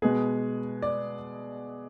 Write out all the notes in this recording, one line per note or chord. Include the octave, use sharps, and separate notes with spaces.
B2 G#3 B3 G#4
D5